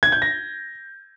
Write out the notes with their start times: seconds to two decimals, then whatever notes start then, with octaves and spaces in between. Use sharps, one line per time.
0.03 G#6
0.12 G6
0.22 A#6